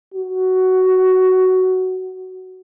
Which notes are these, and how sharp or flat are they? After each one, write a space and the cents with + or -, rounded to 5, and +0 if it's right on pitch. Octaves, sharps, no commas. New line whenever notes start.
F#4 +10